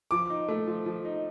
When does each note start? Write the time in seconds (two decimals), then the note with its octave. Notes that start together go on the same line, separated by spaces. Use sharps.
0.11 F3 D6
0.30 D#4
0.48 A3
0.67 F3
0.86 F3
1.05 D#4